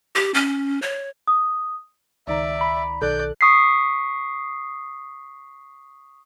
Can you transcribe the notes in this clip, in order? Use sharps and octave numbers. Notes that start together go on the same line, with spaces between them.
G4
C#4
C#5
D#6
C#2 D#3 D5 E5 A#5
B5
B1 D#3 A4 D5 F#6 G6
C#6 D#6 B6 C7